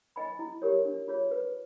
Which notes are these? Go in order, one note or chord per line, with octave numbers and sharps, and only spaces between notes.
D#5 G#5 B5
E4
G4 A#4 C#5
D4
F4 G#4 C#5
B4